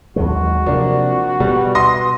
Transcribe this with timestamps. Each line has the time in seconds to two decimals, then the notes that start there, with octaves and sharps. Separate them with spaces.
0.16 D#2 F#3 G#3 F#4
0.66 C3 F3 A#3 D4
1.40 B2 G3
1.75 C6 D#6 A#6